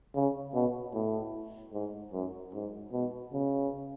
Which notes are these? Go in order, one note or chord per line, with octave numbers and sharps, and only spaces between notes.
C#3
B2
A2
G#2
F#2
G#2
B2
C#3